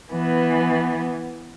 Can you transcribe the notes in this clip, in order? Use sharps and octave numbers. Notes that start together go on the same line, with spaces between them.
E3 B3